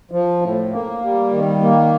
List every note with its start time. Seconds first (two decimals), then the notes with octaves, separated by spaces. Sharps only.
0.12 F3
0.42 A2
0.72 A#3
1.02 G3
1.32 D#3
1.61 A#3